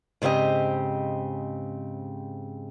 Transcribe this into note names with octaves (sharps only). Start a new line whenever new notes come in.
G#2 C#3 C4 G4 D#5